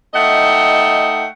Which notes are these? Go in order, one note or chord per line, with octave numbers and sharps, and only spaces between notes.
A3 D#4 D#5 F#5 G5